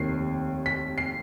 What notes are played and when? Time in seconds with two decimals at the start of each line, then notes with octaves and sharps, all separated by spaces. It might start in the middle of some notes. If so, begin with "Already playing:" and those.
Already playing: F1 D#2 D#3 C7
0.66 B6
0.98 C7